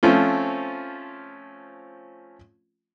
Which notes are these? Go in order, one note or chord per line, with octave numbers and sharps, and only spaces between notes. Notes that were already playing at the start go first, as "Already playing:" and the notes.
F3 A3 C4 C#4 F4